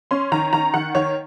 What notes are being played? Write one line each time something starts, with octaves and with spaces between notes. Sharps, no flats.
C#4 C6
D#3 A#5
D#3 A#5
D#3 F#5
D#3 C#5